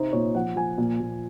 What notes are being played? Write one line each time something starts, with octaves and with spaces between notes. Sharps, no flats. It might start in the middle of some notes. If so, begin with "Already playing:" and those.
Already playing: C3 D#4 C5
A#2 C#5
F3 F#5
F3 G#5
A#2
A#2